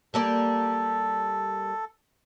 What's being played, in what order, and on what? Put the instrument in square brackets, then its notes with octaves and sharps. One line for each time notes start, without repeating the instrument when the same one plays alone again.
[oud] G3 A#3 D5 [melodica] A4